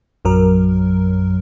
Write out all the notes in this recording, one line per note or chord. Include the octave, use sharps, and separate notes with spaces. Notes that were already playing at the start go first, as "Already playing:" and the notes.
A#1 F#2 F#3 A#4